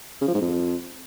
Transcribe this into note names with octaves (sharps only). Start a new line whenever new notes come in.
C#3
F3
G#2
F2